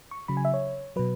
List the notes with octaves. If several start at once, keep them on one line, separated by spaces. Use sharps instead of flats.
C#6
C#3 F#3 B5
G#5
E5
C#5
B2 F#3 B4